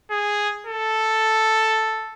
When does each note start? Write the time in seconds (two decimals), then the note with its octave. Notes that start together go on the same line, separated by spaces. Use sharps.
0.10 G#4
0.66 A4